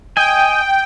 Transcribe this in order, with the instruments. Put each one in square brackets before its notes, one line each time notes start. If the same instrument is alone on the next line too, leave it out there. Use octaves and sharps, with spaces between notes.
[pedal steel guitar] D#5 G#5 [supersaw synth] G5